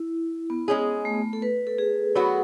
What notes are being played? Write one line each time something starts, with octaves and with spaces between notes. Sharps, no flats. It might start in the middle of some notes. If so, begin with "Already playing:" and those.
Already playing: E4
B3
G#3 C#4 G#4
A3
B3
A4
B4
A4
G#4
F#3 B3 F#4